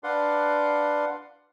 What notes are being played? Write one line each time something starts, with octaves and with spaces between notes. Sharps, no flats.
D4 B4 D5 F5 F#5 C6